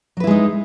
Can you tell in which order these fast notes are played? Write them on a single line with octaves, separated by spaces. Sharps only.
F#3 B4 E4 G#3 D#4